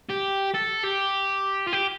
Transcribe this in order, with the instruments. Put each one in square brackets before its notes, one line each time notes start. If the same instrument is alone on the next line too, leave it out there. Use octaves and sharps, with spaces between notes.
[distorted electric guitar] G4
A4
G4
F4
G4